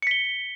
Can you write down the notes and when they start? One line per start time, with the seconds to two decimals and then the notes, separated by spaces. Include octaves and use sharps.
0.02 C#7
0.07 B6
0.11 G7